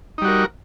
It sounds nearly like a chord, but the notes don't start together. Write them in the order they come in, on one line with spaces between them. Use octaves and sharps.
D#4 G3 F#4 A#4